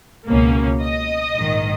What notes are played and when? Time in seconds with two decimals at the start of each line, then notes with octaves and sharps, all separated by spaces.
0.28 C#2 B2 A#3 C#4
0.81 D#5
1.34 A#1 G#2 D#3